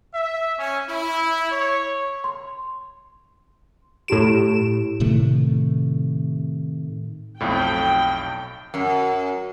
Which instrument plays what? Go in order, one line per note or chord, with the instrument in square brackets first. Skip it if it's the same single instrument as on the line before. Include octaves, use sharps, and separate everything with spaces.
[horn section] E5
C#4
E4
C#5
[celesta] C6
[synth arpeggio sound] A2 E7 [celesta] E4 G4 D7
[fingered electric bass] A2 C3 D#3 A3
[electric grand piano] B1 F2 A2 [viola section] G5
[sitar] F#2